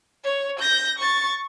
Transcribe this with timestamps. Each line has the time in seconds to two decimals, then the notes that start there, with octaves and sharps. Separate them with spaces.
0.24 C#5
0.59 G6 A#6
0.98 C#6 A6